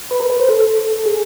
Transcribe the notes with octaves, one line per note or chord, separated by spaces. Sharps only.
B4
A#4
B4
C5
A4
G#4